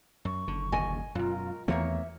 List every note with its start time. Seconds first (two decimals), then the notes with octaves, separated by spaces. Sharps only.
0.25 F#2 C#6
0.48 F#1 D3
0.72 D#1 A#2 D3 D#5 G#5
1.15 F#2 B2 G#3 F4 A#4
1.68 E2 D#3 E3 A3 A#3 C4 C#5 E5